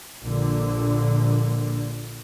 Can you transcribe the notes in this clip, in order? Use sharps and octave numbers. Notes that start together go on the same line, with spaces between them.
A#1 A#2 D3